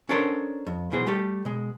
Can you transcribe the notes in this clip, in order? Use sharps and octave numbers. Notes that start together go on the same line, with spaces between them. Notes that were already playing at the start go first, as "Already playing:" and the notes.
C#4 D4 A4 A#4 C5 C#5
F2
B1 B2 E3 G#4 C5
G3 A3 G4 A4
B2 G#3